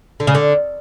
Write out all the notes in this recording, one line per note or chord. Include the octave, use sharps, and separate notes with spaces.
D3
C#3
D3